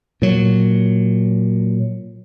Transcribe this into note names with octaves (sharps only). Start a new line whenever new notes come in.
A#2 F#3